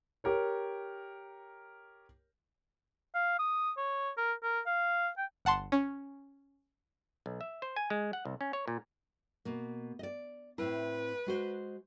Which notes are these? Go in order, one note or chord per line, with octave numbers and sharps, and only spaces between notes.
G4 A#4 C#5
F5
D#6
C#5
A#4
A#4
F5
G5
G1 F#5 A5 C6
C#4
B1
E5
C5
G#5
G#3
F#5
C2
C#4
C#5
A#2
B2 A#3
D5 D#5
A2 C4 E4 B4
G#3 F#4 C5